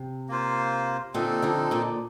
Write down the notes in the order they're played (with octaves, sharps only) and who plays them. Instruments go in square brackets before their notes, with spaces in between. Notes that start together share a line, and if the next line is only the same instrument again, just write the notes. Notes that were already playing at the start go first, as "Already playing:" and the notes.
Already playing: [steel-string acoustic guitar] C3
[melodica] A#3 F4 C5
[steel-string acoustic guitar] A#2 D3 [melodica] C4 D#4 A4
[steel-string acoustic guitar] D3 F3
A#2 D3